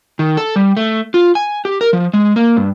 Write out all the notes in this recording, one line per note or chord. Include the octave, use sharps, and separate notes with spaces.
D#3
A4
G3
A3
F4
G#5
G4
A#4
F3
G#3
A#3
G2